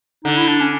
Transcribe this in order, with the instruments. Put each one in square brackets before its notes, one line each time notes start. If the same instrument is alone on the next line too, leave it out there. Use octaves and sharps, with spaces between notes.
[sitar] D3 [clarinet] D#4
[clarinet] E4
D4
C#4